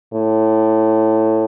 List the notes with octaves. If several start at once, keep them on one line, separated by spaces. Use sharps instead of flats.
A2